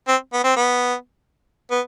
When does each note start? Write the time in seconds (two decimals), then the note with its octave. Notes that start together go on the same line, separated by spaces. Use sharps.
0.08 C4
0.33 B3
0.44 C4
0.56 B3
1.71 B3